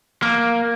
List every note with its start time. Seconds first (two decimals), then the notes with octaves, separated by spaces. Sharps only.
0.22 A#3